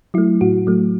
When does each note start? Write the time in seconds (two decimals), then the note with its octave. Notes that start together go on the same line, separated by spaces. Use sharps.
0.14 F#3 A3 E4
0.41 A2 F#4
0.67 F#3 A3